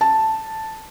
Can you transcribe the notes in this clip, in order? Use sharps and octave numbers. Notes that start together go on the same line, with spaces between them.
A5